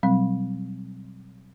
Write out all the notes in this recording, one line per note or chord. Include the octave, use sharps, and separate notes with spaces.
B2 F#3 G3 C4